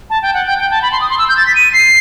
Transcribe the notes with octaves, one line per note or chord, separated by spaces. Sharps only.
A5
G5
F#5
G5
G5
A5
B5
C6
D#6
C6
E6
G6
A6
B6
D#7
C7